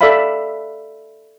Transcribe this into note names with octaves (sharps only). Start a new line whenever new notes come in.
A4 D5 E5 F5 B5